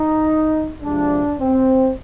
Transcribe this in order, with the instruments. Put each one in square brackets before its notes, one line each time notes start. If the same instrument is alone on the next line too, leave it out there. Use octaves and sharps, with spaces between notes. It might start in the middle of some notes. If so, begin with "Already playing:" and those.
Already playing: [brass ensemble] D#4
C3 F3 G#3 D4
C4